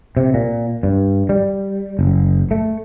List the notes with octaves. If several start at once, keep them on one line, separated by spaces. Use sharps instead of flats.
C3
A#2
G2
G3
F#1
A3